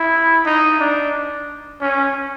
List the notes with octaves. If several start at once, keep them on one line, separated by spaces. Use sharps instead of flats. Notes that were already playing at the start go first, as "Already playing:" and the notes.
Already playing: E4
D#4
D4
C#4